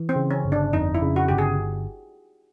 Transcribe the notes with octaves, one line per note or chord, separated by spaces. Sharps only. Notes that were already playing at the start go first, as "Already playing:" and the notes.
Already playing: E3
C4
C#3
C#4
G1
D4
F2 D#4
E4
C#3
F#4
G1 G4
G#4